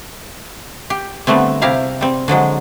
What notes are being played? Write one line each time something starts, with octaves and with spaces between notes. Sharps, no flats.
G4
D3 G3 A3 B3 C4
C3 E4 G4 F5 A#5
G3 C4
D3 F3 F#3 G#3